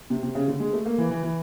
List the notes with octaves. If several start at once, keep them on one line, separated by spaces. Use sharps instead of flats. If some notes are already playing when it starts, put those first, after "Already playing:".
C3
C3
C#3
D3
G#3
A3
A#3
E3
E3
E3